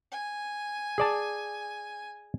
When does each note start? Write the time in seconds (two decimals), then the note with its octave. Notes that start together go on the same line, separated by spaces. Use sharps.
0.11 G#5
0.98 G#4 D5 A5